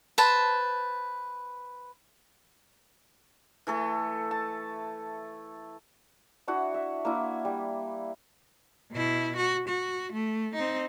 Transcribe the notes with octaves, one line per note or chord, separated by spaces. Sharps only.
B4 C5 A5
E3 A3 A4
A5
D4 E4 F#4 F#5
E5
A#3 D4 E4
G3
B2 E4
F#4
F#4
A3
C4 D#4